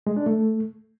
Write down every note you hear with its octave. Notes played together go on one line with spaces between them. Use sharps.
G#3
D4
A3